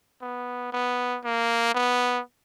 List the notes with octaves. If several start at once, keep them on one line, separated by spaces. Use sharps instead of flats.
B3
B3
A#3
B3